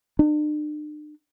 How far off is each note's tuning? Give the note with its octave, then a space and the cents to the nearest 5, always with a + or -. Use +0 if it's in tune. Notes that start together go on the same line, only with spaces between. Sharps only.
D4 +45